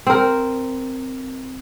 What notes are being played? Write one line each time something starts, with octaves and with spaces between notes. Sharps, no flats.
C4 A#4